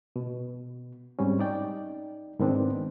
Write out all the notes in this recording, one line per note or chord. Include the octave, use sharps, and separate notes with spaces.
B2
G#2 G3 C4 C#4
D#4 D5 G5
G#2 D#3 B3 C4 D4 D#4